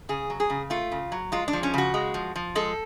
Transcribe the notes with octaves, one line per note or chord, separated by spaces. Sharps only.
C#3 G#4
F#3
G#4
C#3
A3 F4
C#3
F#3
G#3 F4
D4
F3
C#4
C#3 F#4
G#3
F3
F3
G#3 A4